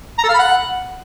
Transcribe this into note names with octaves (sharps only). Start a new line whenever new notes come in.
A#5
A4
F5
B5
F#5